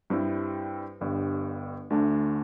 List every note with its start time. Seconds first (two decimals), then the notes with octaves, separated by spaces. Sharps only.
0.10 G2 G3 C4 E4
1.01 G1 G2 G3
1.90 D2 D3 A3 D4